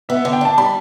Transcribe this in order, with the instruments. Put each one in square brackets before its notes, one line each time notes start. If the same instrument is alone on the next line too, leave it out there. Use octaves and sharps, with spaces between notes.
[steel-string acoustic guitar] B3 [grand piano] E5
[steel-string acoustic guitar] D3
[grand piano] G5
[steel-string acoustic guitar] D4 [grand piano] A5
[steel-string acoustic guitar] G3 [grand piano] B5